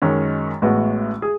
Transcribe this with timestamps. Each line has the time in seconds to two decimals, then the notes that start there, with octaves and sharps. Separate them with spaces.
0.02 F#2 D#3 G#3 C#4
0.62 A1 A2 G#3 B3 F#4
1.22 G#4